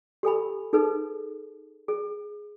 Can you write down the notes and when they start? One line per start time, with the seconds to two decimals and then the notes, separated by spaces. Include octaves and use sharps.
0.23 G4 A4 G#5 B5
0.73 D#4 G#4 A4 B4
1.88 G#4